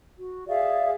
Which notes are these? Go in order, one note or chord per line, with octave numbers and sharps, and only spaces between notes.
F#4
G#4 D5 E5 F5